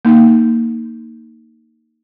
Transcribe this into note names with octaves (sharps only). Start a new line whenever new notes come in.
A#3 D#4